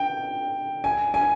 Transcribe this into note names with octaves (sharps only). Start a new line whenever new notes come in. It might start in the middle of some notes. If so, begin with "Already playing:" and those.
Already playing: G5
G#5
G#5